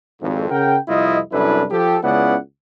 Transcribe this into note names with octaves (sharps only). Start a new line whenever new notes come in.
G#1 F2
C#3 A#4 F#5 G5
C2 F2 E4 F4 D#5
C2 F#2 D4 E4 A4 B4
F3 G4 A4
C#2 C#3 B3 E4 D5 F#5